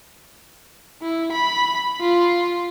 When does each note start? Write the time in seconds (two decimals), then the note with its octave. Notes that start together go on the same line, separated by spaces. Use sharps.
1.02 E4
1.32 B5
2.01 F4